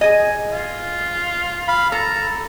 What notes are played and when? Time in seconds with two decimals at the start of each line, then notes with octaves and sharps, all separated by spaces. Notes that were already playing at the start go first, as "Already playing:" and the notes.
0.01 G#4 D#5 G#5
0.51 F4
1.68 F5 B5
1.92 A4 A5 A#5